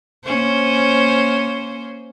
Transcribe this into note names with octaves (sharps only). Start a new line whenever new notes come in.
A#3 C#4 C5